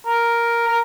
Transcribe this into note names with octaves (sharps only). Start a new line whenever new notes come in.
A#4
A#4